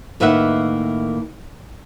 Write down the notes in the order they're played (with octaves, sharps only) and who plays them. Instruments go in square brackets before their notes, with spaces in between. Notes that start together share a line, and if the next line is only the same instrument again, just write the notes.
[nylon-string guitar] A2 D#3 A#3 B4 E5 F#5